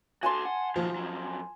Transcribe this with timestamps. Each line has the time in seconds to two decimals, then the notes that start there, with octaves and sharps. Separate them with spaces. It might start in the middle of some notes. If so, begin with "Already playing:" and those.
0.23 F#4 A4 G#5 A5 C6
0.46 F#5
0.76 D#3 F3 F#3
0.96 F2 F#3